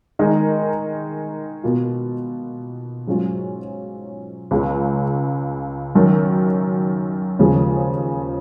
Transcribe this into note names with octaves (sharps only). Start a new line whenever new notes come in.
D#3 G#3 D#4 A#4
B2 A#3 F4
G#2 F#3 C#4 F4
C#2 C#3 G#3
F#2 D#3 F#3
D#2 C#3 F3 G#3